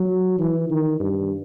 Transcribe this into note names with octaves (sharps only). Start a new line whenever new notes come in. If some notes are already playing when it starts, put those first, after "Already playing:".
Already playing: F#3
E3
D#3
G2